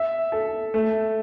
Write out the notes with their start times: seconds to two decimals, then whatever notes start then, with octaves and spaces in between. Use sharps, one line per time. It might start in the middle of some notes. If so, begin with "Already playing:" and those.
Already playing: E5
0.32 A4
0.74 A3